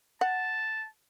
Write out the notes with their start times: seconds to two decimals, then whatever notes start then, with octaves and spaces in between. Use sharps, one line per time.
0.21 F#5 A5